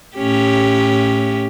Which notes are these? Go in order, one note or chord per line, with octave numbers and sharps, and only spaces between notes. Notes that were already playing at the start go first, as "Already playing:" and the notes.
A2 C#4 G4